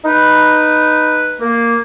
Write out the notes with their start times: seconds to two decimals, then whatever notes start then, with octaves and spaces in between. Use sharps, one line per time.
0.05 D#4 B4
1.41 A#3